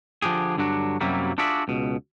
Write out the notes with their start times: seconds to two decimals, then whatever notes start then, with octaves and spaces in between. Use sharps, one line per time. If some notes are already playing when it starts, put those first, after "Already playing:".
0.22 D3 F3 D4 G4 G#4
0.58 G2 D3 F#3 D4 F#4
1.00 F#2 C3 F#3 G3 A#3 E4
1.38 D4 F4 F#4 G#4 D5 E5
1.68 C#2 B2